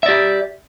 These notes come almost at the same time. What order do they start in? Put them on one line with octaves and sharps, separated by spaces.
E5 D5 G4